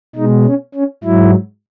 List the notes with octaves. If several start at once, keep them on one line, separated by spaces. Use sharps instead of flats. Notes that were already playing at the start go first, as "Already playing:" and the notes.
B2 G#3 D#4
C#4
C#4
G#2 F#3 E4